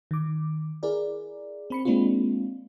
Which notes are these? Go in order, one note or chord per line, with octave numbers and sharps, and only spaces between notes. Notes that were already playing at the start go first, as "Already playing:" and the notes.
D#3 D6
E4 G#4 A#4 D5
C4 B5 C#7
G#3 A#3 C4 D4 D#4 F4